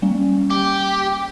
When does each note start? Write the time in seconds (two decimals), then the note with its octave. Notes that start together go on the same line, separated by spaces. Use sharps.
0.02 G3 A#3 C#4
0.50 G4